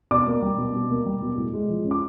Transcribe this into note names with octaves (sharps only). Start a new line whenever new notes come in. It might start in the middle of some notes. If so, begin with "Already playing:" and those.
B2 D5 D6
A#3
G3
B2
B2
A#3
G3
B2
A2
G#3
F3
C#4
D6